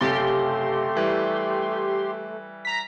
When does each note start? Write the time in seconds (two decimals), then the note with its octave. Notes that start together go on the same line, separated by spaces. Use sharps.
0.01 F#1 C3 A3 G4 C6 A6
0.95 E3 G3
2.65 A#5 B6